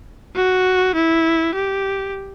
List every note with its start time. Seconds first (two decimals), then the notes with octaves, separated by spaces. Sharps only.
0.36 F#4
0.95 E4
1.54 G4